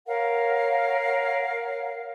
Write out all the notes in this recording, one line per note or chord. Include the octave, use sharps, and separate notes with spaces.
A#4 C#5 F5 F#5